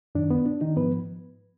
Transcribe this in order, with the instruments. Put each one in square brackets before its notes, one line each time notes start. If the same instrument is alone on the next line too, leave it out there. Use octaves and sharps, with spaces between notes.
[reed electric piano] F#2 D#3 D4
B3
D4
D#3 D#4
G#2 F3 B3 B4